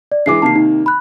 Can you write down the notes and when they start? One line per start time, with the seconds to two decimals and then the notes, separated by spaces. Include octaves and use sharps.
0.12 D5
0.26 E3 G#3 D4 D6 C7
0.42 C3 D#3 A#3 A5 C7
0.56 D#4
0.86 B5 F#6